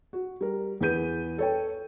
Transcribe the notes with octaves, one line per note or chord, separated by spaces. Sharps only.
F#4
G3 A#4
E2 G#4 B4 G6 D#7
A4 C#5 G5